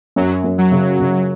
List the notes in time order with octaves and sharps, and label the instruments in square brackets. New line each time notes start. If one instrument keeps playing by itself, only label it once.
[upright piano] F#2 [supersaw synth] F#3
[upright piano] F#2
[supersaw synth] F#3
[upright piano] C#3
C#3